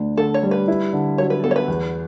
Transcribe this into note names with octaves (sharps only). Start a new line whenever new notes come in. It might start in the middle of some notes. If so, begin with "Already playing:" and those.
Already playing: D2 D4
D3 A4
C#5
G3
B4
E4
D3
F#3 C#5
B4
B3 A4
C#5
B4
E2